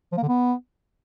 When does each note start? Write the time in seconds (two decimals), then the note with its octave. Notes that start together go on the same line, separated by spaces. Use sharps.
0.12 F3
0.18 A#3
0.23 D3
0.28 B3